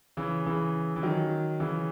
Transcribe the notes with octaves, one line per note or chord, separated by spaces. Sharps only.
C#3 E3
C#3 E3
E3
D#3 F#3
C#3 E3